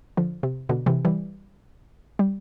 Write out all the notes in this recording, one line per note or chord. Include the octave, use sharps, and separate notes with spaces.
D3 F3
C3
B2 D3
C3 E3
E3 G3
G3